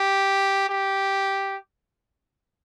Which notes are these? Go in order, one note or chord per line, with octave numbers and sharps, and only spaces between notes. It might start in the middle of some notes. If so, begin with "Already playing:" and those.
Already playing: G4
G4